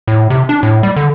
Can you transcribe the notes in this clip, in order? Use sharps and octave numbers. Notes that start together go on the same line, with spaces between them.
A2
C3
D4
A2
G3
D3